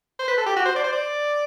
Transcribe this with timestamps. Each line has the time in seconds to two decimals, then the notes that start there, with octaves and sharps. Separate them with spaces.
0.19 C5
0.28 B4
0.38 A4
0.46 G4
0.56 F#4
0.65 C5
0.76 D5
0.84 C5
0.93 D5